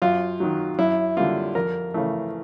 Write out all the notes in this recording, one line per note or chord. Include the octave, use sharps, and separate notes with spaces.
F#2 F4
D#3 F#3
F#2 E4
D3 G3 A#3 F4
F2 A#4
C#3 E3 A3